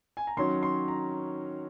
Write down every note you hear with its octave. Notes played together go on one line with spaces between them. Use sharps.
G#5
A#5
D#3 F#3 C#4 C6
C6
A#5